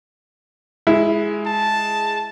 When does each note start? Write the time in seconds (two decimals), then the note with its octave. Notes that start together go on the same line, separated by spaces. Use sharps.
0.87 G#3 E4
1.47 A5